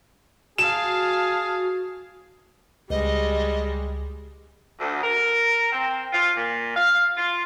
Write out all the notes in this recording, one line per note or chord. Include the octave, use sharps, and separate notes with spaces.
F#4 G#4 F5 A5 E7
C#2 G3 G#3 D#5
D2
A#4
C4
F4
A#2
F5
F4